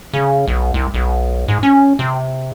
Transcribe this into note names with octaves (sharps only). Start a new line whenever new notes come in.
C#3
B1
C2
B1
G#2
C#4
C3